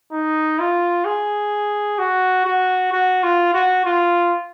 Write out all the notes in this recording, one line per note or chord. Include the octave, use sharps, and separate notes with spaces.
D#4
F4
G#4
F#4
F#4
F#4
F4
F#4
F4